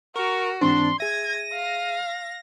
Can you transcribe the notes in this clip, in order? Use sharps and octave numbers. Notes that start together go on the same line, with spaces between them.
F#4 A#4 C#6
G#2 E3 C4 D4 C6
G#4 E5 G#6 A#6 D#7
F5